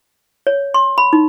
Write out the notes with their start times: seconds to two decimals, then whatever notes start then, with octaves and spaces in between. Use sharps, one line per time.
0.47 C#5
0.74 C6
0.98 B5
1.13 D#4